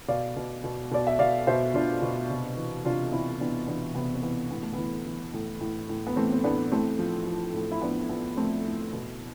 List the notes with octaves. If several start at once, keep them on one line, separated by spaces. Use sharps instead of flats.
B2 D5 F5
B2
B2
B2 D5
E5
B2 D5 F5
B2 C5 E5
B2 D4 F4
B2
C3
E3
C3 D4 F4
E3 C4 E4
E3 B3 D4
E3 B3 D4
C3 B3
C4
E3 B3
A2 B3
A3
E3 B3
E3
A2
A2
A2
B3
E3 A3 C4
C4
A2 B3 D4
A2 A3 C4
F3
F3
A2
E4
F3 B3 D4
F3 B3
F3 A3 C4
A2
B2